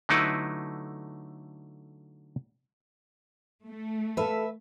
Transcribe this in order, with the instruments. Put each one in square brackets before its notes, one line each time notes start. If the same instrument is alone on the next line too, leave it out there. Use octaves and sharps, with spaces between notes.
[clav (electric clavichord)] D3 F#3 A3 D#4 E4 B4
[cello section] A3
[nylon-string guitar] A4 F5 [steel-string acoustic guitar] B4 E5